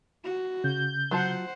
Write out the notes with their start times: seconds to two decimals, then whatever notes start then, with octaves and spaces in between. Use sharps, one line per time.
0.24 F#4
0.64 C#3 G6
1.11 F#3 F4 C5 F#5 A5